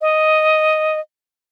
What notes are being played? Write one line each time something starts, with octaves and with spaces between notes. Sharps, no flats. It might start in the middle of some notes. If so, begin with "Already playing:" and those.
D#5